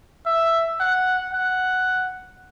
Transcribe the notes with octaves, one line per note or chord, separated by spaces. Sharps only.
E5
F#5
F#5